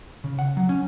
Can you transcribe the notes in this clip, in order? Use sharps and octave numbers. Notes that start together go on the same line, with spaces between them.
C#3
F#5
F#3
C#4